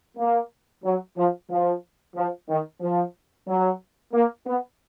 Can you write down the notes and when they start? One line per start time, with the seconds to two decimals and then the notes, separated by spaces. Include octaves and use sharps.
0.17 A#3
0.84 F#3
1.16 F3
1.49 F3
2.15 F3
2.48 D#3
2.81 F3
3.47 F#3
4.12 A#3
4.45 B3